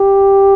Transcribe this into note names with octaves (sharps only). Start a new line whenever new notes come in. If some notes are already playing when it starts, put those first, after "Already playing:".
Already playing: G4